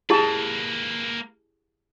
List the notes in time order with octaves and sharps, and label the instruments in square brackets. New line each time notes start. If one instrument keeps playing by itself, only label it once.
[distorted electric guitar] A#3 B4 [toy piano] E4 G4 [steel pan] G#4 A5